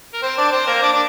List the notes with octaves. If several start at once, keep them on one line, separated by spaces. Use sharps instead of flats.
A#4
C4 C5
D4 D5
C4 C5
A#3 A#4
D4 D5
D4 D5